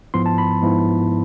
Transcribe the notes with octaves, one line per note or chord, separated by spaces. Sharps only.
G#2 F3 B3 E4 C6
A5
B5
G#2 F3 B3 E4